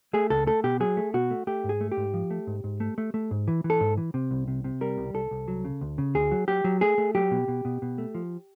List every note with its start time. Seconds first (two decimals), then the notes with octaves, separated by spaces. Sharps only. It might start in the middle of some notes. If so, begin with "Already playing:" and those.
0.14 A3 G#4
0.30 C#2 A4
0.47 A3 A4
0.64 B2 G4
0.80 F#3 G#4
0.97 A3
1.14 B2 F#4
1.31 A3
1.47 A3 G4
1.64 G#2
1.69 G#4
1.81 A3
1.92 G4
1.97 G#2
2.14 F3
2.30 A3
2.47 G#2
2.64 G#2
2.80 A3
2.98 A3
3.14 A3
3.31 G#2
3.48 E3
3.64 E3
3.70 A4
3.81 G#2
3.97 E3
4.14 C3
4.31 C2
4.48 C3
4.64 C3
4.81 G3 A#4
4.98 C2
5.14 C2 A4
5.31 C2
5.48 F#3
5.65 C#3
5.81 D2
5.98 C#3
6.15 D2 G#4
6.31 F#3
6.48 F#3 G4
6.64 F#3
6.81 A3 G#4
6.98 A3
7.15 F#3 G4
7.31 B2
7.48 B2
7.65 B2
7.82 B2
7.98 A3
8.15 F3